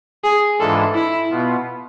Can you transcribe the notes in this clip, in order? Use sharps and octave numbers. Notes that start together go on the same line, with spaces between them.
G#4
G#2 E3 G#3 D4 F4 A4
E4
B2 B3 F4